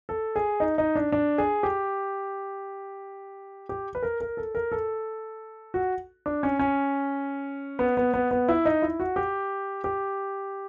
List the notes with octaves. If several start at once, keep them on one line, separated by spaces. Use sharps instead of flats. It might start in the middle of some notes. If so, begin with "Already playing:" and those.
A4
G#4
D#4
D#4
D4
D4
G#4
G4
G4
B4
A#4
A#4
A4
A#4
A4
F#4
D4
C#4
C#4
B3
B3
B3
B3
E4
D#4
E4
F#4
G4
G4